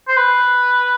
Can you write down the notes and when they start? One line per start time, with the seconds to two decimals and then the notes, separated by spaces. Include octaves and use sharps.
0.08 C5
0.16 B4